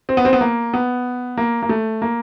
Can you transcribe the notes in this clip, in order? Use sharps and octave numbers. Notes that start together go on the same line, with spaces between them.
C4
B3
C4
B3
A#3
B3
A#3
A#3
A3
A#3